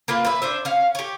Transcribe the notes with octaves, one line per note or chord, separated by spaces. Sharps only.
A#3 F4 B4
B4 E5
D4 C5 E5
C#4 F5
G4 C#5